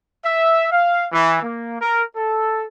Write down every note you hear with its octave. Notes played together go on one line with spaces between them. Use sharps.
E5
F5
E3
A#3
A#4
A4